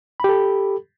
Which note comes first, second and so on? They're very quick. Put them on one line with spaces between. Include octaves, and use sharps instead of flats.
B5 G4 A4